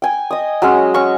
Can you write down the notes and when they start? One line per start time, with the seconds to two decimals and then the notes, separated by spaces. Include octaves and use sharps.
0.02 G5 G#5
0.31 D#5 D#6
0.62 F#3 G#3 C#4
0.94 C#4 C#6